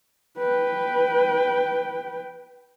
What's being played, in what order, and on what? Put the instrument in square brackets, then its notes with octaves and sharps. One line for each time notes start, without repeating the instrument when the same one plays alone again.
[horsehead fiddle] B4 G5